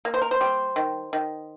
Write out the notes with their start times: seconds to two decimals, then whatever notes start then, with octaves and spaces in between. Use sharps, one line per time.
0.05 A#3
0.14 C5
0.22 A#4
0.31 C5
0.41 G3
0.76 D#3
1.13 D#3